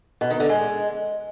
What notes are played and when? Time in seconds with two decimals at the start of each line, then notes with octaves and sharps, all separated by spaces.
0.21 B2
0.30 D#3
0.40 D3
0.49 G#3